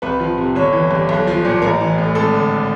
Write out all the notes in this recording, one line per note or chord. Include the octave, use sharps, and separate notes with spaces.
C2 B4
F3
C3
G1 C#5
E3
G2
B1
F3
A#2
A1 A#4
E3
A2
G#1 A4
D3